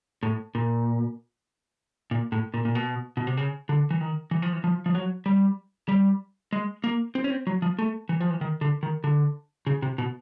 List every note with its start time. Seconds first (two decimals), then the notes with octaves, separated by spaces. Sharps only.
0.23 A2
0.55 A#2
2.11 A#2
2.32 A2
2.54 A#2
2.65 A#2
2.75 B2
3.17 B2
3.27 C3
3.37 C#3
3.69 D3
3.91 E3
4.01 D#3
4.31 E3
4.42 F3
4.53 E3
4.64 F3
4.86 F3
4.95 F#3
5.26 G3
5.89 G3
6.53 G#3
6.84 A#3
7.15 C4
7.24 C#4
7.30 C4
7.47 F#3
7.62 F3
7.79 A3
8.09 E3
8.20 F3
8.30 E3
8.41 D#3
8.61 D3
8.83 D#3
9.04 D3
9.67 C#3
9.82 C3
9.98 B2